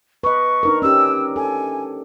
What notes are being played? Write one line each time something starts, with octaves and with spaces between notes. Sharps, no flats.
B4 D#5 C#6
D4 D#4 A#4
C#4 G4 E6
A4 G#5